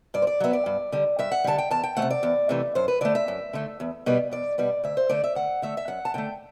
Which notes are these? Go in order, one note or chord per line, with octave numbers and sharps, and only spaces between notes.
G2 D5
C5
D5
F#3 B3 E5
D5
G2
D3 G3
G2 E5
F#5
D3 G3 A5
G5
E2 A5
G5
E3 A3 F#5
C3
D5
E2
C3 E3 A3
F#2 C5
B4
D3 A3 D5
E5
F#2
D3 A3
E2
B2 G3 B3
E2 D5
B2 G3 B3 D5
D2 E5
C5
D3 A3 D5
E5
D2 F#5
D3 A3 E5
E5
F#2 F#5
A5
D3 A3 G5